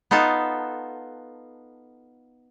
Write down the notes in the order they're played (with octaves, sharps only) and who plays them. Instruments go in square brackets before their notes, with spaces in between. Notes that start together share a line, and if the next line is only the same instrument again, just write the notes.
[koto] B3 D#4 F4 A4